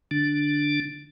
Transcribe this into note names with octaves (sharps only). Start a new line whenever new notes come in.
D3 D4